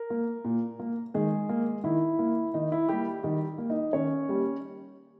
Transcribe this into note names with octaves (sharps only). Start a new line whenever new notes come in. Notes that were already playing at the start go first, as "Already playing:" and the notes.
Already playing: A#4
A#3
A#2
A#3
D#3 G#3 G#4
A#3
D#3 E4
A#3
D#3 D#4
E4
G3 A#3 G4
D#3 G3 G4
A#3
D#4
D#3 C#4 C#5
G3 A#3